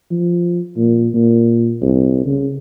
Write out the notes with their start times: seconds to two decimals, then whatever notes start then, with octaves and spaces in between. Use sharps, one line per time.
0.11 F3
0.77 A#2
1.14 A#2
1.82 C2
2.26 C#3